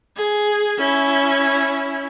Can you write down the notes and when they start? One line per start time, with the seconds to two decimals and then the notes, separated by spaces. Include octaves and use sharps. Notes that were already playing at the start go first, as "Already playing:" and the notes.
0.16 G#4
0.77 C#4 E4